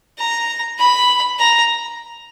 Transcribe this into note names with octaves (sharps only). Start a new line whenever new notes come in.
A#5
B5
A#5